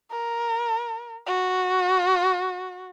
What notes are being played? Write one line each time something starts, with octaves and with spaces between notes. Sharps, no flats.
A#4
F#4